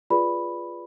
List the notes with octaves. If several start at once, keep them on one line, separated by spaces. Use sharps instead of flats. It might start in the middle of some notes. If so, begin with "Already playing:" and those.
F4 G#4 B4 D5 B5